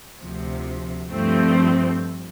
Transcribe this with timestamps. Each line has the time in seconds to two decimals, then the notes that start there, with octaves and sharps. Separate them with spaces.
0.19 D2 C3 F3
1.12 G2 F3 A3 C4